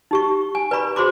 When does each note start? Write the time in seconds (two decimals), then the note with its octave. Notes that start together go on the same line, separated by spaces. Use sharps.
0.11 D#4 G4 C#6
0.55 G#5
0.71 B4 D5 A#5 B5 C#6
0.96 F#4 G#4 C5 B5 C6 D6